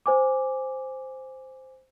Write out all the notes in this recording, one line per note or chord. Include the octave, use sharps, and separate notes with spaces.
C5 G#5 D6